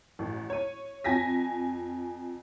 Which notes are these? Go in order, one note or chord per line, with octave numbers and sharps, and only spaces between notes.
A1
C#5 D#7
F2 G#5 A#6 B6